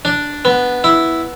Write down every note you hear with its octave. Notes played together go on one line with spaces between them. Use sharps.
D4
B3
E4